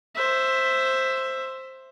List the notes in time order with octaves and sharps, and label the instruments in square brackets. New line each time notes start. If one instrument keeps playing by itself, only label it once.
[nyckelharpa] C5 E5